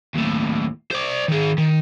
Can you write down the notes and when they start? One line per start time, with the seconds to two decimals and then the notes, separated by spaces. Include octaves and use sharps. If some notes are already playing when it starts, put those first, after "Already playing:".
0.15 D#2 A2
0.91 C5 D5
1.28 D#3 G#4
1.58 D#3